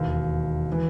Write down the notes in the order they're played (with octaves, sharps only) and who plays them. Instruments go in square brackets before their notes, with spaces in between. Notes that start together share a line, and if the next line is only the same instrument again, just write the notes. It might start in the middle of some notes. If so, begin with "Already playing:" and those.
Already playing: [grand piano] E1 D#2 D#3
E3